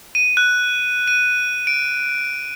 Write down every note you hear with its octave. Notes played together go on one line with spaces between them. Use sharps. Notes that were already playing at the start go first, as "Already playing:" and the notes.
D#7
F#6
D#7
D7